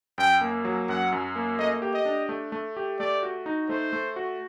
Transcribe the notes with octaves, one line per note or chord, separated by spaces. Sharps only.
F#2 G5
A#3
F#3
F#2 F#5
F#2
A#3
A3 D#5
G4
D#5
D4
A3
A3
G4
A3 D5
F#4
D#4
A3 C5
A3
F#4